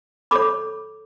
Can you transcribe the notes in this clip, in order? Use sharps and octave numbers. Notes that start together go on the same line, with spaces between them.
A4 C#5 B5 D6